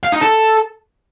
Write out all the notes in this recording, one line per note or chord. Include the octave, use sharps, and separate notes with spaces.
F5
D#4
A4